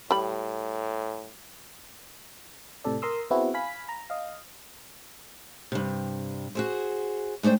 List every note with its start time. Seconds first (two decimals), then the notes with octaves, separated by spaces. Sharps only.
0.11 A2 G3 B5
2.84 A2 C3 A4 D5
3.02 A#4 A#5 C6 D#6 E6
3.30 B3 C4 E4 F#4 G#4
3.54 F5 G#5 B5 B6
3.89 A#5
4.10 D#5 F5
5.72 G2 C3
6.55 F#4 G#4 C5
7.43 G#3 A3 D4 C5 G5